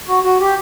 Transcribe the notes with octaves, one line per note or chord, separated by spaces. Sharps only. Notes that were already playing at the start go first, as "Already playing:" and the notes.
F#4
F#4
G4